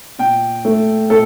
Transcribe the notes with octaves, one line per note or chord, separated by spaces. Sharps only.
A#2 G5
A3
A#2 A4